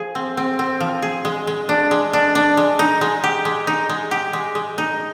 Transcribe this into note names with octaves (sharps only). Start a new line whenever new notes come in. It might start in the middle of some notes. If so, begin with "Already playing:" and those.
Already playing: F3 G#4
C4
C4
C4
F3
G#4
G#3
G#3
D4
G#3
D4
D4
G#3
D#4
G#3
G4
G#3
D#4
G#3
G4
G#3
G#3
D#4